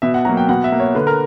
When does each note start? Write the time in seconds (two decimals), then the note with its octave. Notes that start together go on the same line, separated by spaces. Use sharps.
0.02 B2 E5
0.14 F#5
0.25 F#3 A#3 A#5
0.37 G5
0.49 B2 F#5
0.64 E5
0.72 A#3
0.80 C#5
0.95 D3 B4
1.07 A#4